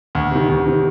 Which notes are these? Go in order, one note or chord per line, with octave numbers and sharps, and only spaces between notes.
D2
C3 D#3
D2
C3 D#3